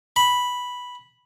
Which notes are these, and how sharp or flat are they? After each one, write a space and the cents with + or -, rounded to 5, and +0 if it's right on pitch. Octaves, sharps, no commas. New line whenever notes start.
B5 -5